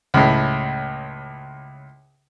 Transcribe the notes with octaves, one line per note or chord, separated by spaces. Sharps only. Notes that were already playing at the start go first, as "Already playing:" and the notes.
C#2 A2